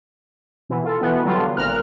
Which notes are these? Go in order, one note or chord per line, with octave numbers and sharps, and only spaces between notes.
B2 E3
F4 A4
B2 E3 B3
D3 F#3 G3 F4
G#1 A#2 A#4 F6 F#6